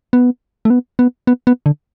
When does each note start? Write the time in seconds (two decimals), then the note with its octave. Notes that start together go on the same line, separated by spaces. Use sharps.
0.13 B3
0.65 A3
0.70 B3
0.99 B3
1.27 B3
1.47 B3
1.66 D3